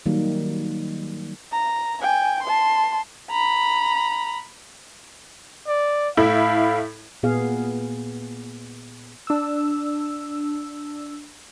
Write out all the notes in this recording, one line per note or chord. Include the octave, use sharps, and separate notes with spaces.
D#3 F#3 G3 A#3
A#5
G5 G#5
A5 C6
A#5 B5
D5
A2 E4 F5
A#2 B3 G#4 F5
D4 E6